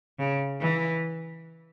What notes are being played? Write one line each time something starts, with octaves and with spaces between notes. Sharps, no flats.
C#3
E3